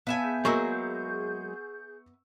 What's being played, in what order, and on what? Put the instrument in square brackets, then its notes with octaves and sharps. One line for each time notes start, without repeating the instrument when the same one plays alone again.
[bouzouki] B3 E5 G#5 [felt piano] F5 A5
[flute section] G#4 G6
[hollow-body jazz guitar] F#3 G#3 A#3 [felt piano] C#6 E6